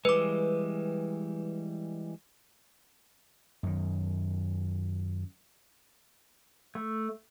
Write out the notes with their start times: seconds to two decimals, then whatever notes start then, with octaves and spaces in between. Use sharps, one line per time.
0.05 E3 G3 G#3 B4 D6
3.63 F#2 D#3
6.75 A3